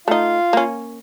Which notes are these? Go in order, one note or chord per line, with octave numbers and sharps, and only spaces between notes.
A3 D#4 F4 F5
A#3 C#4